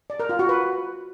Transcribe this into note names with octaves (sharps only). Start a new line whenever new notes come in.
D5
A#4
F4
F#4
B4